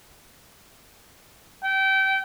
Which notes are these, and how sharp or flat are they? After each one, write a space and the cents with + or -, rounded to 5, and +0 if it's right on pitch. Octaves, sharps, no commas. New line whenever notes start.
G5 -25